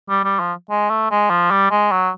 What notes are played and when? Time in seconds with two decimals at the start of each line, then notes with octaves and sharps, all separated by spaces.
0.09 G3
0.24 G3
0.40 F3
0.70 G#3
0.90 A3
1.11 G#3
1.30 F3
1.51 G3
1.71 G#3
1.91 F#3